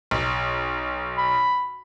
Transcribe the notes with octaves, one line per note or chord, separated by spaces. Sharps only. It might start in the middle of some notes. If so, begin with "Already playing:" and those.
B1
B5